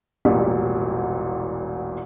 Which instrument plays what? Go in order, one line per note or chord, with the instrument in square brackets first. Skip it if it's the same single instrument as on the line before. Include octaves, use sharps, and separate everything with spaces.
[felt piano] E1 A1 A#2 G3